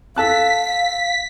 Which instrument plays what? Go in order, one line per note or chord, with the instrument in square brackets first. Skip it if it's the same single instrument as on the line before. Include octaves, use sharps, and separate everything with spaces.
[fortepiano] A4 A5 F#6 [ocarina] F5 [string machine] B6